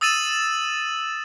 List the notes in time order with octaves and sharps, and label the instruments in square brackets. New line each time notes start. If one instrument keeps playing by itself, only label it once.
[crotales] D#6 E6 A6 D#7 E7 F#7